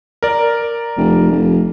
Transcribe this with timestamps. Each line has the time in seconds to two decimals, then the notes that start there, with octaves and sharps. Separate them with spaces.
0.23 A#4 D5
0.97 F1
1.31 F1